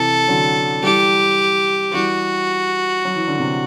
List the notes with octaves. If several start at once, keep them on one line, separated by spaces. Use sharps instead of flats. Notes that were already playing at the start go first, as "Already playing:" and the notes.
Already playing: C3 E3 A4
D3 F#3
E3 G3 G4
E3 G3 F#4
F#3
E3
D3
C3 E3